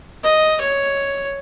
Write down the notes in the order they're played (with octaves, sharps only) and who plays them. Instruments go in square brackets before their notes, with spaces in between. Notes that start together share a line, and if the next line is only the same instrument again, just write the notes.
[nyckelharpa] D#5
C#5